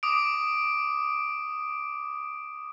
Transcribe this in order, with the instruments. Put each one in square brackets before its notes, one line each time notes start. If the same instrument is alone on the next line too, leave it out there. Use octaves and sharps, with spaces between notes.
[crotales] D6 D#6 D7